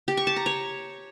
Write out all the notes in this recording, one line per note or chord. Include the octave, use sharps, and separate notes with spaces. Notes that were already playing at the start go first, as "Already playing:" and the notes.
G4
C#6
A5
A#5
C#5